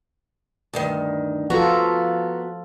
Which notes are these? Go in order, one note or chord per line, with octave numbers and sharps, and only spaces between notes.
D2 G2 D#3
F3 B3 F4 F#4 A4 A#5